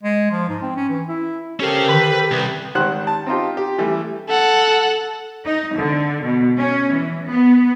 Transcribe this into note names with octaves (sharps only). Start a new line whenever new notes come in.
G#3
F3
G#2
C4
C#4
E3
E4
C#4 G4 A4 A#4 C5 F5
D3 D#3 B4
C2 B4 D#6 G6
G#1 D#3 G3 C5 F#5 F#6
A5
C4 D#4 F4 G4
G4
E3 G3 A3
A4 F#5
D#4
D3
B2
C#4
E3
B3